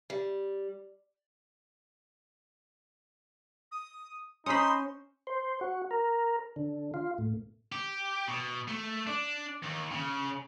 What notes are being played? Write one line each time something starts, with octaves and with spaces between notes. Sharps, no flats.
G3
D#6
C#4 D#4 C5 B5 C6 D#6
C5
F#4
A#4
D3
F4
A2
G4
B2
A3
D4
D#2
C#3